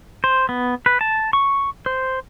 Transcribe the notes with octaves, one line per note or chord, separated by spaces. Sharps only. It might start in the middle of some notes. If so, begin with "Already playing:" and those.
C5
B3
B4
A5
C#6
C5